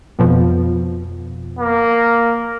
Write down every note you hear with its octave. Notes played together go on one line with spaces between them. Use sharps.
F2 B2 F3
A#3